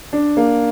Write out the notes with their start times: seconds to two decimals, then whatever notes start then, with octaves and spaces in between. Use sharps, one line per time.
0.13 D4
0.37 A#3